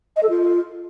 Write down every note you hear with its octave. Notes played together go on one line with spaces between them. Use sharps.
D#5
A4
F4